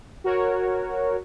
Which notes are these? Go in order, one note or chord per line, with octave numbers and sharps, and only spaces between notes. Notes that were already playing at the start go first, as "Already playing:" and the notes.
F#4 A#4 C#5